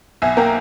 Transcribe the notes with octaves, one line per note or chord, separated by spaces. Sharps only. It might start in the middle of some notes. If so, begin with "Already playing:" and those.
B1 E5 G#5
A#3 G5 A#5